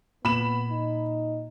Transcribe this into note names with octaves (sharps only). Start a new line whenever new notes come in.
A#2 B3 B5 E7
D#4